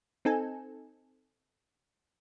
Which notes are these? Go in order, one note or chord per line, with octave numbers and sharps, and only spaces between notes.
C4 D#4 A4 G#5